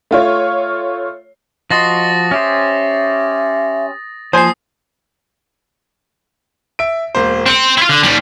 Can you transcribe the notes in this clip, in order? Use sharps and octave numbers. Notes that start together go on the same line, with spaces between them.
A3 F4 C#5
F3 F#4 D#5 C6 D#6 A6 A#6
C#4 G4 C5 E5
F3 A#3 C5 G#5 D#6 C7
E5 D7
E1 A#3 C5
C4 G6 C#7 D7
E4 F4
D3
D#2 G3 F#7